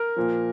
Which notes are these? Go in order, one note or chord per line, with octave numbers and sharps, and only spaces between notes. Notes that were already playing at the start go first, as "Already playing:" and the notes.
Already playing: A#4
A#2 F3